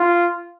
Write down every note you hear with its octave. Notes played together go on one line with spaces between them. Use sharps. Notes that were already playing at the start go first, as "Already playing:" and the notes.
Already playing: F4